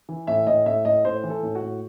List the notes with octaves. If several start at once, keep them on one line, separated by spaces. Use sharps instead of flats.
E3
A2 E5
A2 D#5
A2 E5
A2 D#5
A2 C5
E3
A4
A2
F#4
A2